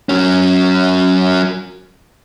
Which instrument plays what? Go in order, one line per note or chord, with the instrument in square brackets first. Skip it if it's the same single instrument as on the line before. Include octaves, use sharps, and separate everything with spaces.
[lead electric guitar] F#3 C#4